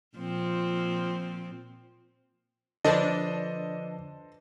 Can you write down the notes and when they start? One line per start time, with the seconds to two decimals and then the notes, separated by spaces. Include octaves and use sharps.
0.17 A#2 F3 C4
2.85 D3 F3 D4 A4 B4 C5 D#5 A5